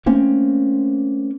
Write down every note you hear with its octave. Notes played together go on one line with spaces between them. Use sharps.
A3 A#3 C4 C#4